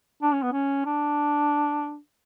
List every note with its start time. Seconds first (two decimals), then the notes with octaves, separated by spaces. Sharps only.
0.23 D4
0.33 C#4
0.43 B3
0.52 C#4
0.85 D4